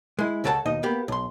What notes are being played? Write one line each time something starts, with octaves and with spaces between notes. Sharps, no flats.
G#3 E4
C#2 C#3 A4 A#4 F#5 A5
D#2 B2 D#4 D#5
A#3 B3 G4
B1 C6